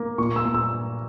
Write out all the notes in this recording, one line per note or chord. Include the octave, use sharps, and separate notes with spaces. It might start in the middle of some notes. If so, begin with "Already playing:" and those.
Already playing: A#3
A#2 C#6
E6
A#2
E6